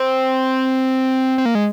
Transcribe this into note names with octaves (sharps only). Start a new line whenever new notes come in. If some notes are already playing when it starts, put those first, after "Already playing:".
Already playing: C4
C4
A#3
G#3